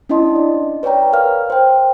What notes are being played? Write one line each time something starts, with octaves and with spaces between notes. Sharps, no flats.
C#4 D4 E4 D#5 A5 C6
D5
B4 C#5 D5 G5 A#5
A#4 F5 F6
C5 G5